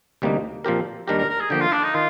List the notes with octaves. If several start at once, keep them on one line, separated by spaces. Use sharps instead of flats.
D2 C3 G3 A#3 D#4
A#2 F3 C4 G4 A#4
D#2 D#3 G3 D4 G4 A#4
A#4
A#4
G#4
D3 F3 A#3 G4
F4
D4
D#4
D#3 F4